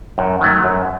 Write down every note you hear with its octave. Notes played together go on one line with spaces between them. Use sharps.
F#2
D#3 F#3 A3
F#2